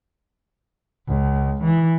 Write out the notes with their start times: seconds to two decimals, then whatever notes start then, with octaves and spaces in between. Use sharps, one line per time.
1.08 C#2
1.64 E3